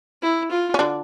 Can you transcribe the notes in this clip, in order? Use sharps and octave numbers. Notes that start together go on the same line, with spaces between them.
E4
F4
C#4
D3 D4